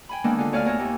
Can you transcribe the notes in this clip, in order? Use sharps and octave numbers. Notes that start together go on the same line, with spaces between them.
G5 G#5 B5
D#3 E3 G#3 A#3 B3 D4
D3 F4
D2 C#5 D5 F5 G#5 F6
B3 A#4 C#5 E5
D#2 A#3